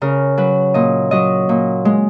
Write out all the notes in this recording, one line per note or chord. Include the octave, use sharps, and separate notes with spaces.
C#3 A#4
F#3 B4
A#2 D#5
F#3 D#5
A#2
G#3